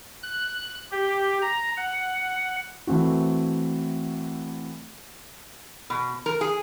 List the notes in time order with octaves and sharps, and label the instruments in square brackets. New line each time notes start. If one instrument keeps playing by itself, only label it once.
[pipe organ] F#6
G4
A#5
F#5
[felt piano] E3 A3 C4 F#4
[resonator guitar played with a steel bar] B2
A#4
G#4